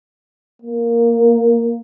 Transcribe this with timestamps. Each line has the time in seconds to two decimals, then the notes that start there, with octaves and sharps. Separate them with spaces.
0.62 A#3